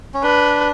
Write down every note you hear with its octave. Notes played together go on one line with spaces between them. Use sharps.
C#4
D4 B4